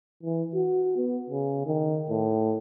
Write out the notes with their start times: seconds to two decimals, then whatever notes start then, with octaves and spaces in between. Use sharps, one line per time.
0.23 E3
0.55 F#4
0.97 B3
1.30 C#3
1.66 D#3
2.10 A2